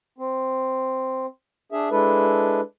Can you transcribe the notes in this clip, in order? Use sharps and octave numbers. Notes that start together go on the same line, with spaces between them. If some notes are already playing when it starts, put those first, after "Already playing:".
C4
D4 G#4 E5
G#3 D4 E4 A4 B4